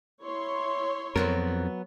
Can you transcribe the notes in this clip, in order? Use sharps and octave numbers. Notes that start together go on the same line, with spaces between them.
E4 C#5 C6
F2 F#3 B3 A#4